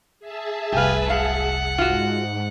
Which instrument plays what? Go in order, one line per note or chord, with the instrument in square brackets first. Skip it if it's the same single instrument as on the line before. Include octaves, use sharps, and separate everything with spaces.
[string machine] G#4 E5 A5
[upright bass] F1 C2 [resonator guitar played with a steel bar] G4 F5 [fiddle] B4 G#5
[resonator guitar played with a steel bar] F#3 F5 [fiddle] F#5
[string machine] G#2 [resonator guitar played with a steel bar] F4 F#4